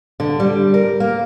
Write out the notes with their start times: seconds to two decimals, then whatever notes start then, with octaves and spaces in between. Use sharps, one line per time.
0.20 D3
0.40 G3
0.74 A#4
1.00 A#3